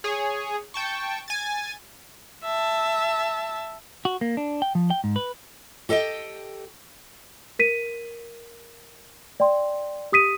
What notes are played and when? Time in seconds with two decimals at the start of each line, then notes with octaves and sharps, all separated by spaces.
0.04 G#4 C#5
0.74 G5 A5 C#6
1.28 G#5 A6
2.44 E5 A5
4.05 F#4
4.21 A#3
4.37 D4
4.62 G5
4.75 F3
4.90 G5
5.04 G#2
5.16 B4
5.89 G4 A4 D#5 F5 G5
7.59 A#4 B6 D#7
9.40 D5 G5 C6
10.12 G4 D#6 B6 D#7